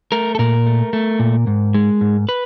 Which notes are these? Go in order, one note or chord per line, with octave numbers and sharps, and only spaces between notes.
A3 A#4
A4
A#2 A#4
A3
A3
A#2
G#2
G#3
G#2
B4